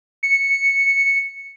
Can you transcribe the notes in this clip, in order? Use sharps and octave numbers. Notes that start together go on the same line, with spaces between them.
C#7